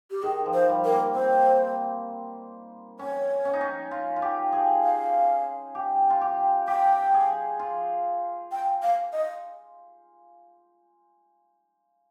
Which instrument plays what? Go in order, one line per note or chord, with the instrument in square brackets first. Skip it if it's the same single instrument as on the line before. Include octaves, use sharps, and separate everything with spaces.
[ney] G4
[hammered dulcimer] D#3 [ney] G#4
[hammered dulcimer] F3
[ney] C5
[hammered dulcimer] G3
[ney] A#4
[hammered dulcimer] A#3
[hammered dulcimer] C4 [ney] C5
[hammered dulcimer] C#4 [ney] C#5
[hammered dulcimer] C#4
D#4
C#4
F4
F4
G4
G#4
[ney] F5
[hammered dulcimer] G4
F4
G4
[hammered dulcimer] G4 [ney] G5
[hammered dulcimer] G#4
F4
[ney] G5
F5
D#5